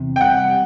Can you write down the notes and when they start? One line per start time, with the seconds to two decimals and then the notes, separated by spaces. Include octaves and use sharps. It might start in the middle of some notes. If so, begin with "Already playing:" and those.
Already playing: E2 C3
0.16 G5
0.21 G3 F#5